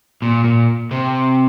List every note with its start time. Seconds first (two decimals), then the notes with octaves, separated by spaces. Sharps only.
0.22 A#2
0.44 A#2
0.91 C3